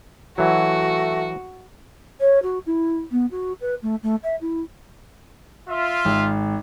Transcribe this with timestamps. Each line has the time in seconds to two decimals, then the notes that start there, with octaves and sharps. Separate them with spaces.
0.38 E3 F#3 A3 F#4
2.20 C#5
2.42 F#4
2.66 E4
3.11 B3
3.31 F#4
3.61 B4
3.82 A3
4.03 A3
4.23 E5
4.41 E4
5.69 F4 E5
6.05 G#1